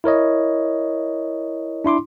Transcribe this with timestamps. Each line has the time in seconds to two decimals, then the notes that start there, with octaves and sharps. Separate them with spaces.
0.04 E4 A#4 C#5 D#5
1.84 D4 E4 C6 D6